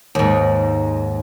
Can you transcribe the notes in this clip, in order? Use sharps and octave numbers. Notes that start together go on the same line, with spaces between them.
D#2 G#2